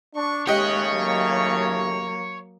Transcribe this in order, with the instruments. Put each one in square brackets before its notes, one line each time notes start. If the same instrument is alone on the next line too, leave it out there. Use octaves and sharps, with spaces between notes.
[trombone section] D4 [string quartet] C#6
[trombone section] D#2 C#3 A3 [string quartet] G#3 F#6 [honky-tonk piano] G4 D#5 [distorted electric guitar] C#5
[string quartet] F#3 A#3